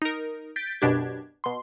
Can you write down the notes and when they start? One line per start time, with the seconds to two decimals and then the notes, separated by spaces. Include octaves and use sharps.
0.02 D#4 A#4
0.56 G6 A6 B6 D7
0.81 F#2 B2 D4 G4 G#6
1.44 B2 C6